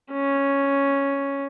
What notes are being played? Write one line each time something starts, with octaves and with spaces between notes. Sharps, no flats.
C#4